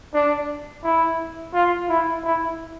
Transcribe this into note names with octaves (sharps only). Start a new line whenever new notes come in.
D4
E4
F4
E4
E4